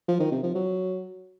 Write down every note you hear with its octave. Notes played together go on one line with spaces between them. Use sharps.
F3
D#3
C3
F3
F#3